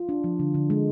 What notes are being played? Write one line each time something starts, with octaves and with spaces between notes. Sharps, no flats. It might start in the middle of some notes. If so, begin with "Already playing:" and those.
Already playing: F4
D4
F3
D3
D3
G#3